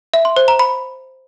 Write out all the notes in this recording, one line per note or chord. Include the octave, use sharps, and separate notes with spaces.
E5
C6
C5
A#5
B5